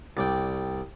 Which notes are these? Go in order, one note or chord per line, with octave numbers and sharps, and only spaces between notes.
C2 D5 G5